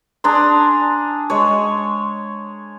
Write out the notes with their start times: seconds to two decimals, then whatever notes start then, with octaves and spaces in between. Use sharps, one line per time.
0.24 D4 G#4 A#5 C6
1.30 G#3 C#5